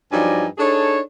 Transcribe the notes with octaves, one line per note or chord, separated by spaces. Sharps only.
G2 F3 F#3 D#4 D5 G#5
D4 D#4 G#4 A4 C#5